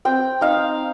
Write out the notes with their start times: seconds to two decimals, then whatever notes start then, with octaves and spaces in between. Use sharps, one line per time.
0.05 C4 G5
0.41 D#4 F5